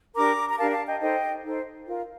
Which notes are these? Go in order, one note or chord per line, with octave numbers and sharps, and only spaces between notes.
D4 G4 A#4 A#5 D6
A#5
D4 G4 A#4 F5 A5
F5 A5
D#5 G5
D#4 A4 C5 D#5 G5
D#4 A4 C5
F4 A#4